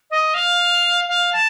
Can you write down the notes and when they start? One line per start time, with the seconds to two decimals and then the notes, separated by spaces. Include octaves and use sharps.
0.11 D#5
0.34 F5
1.08 F5
1.33 A5